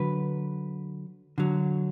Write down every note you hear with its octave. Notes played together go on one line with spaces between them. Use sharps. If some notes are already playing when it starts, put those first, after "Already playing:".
Already playing: D3 F#3 B4
D3 F#3